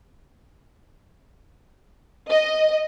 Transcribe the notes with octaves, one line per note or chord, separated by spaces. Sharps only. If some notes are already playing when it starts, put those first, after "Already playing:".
D#5